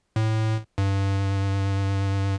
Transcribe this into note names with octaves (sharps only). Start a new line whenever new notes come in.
A2
G2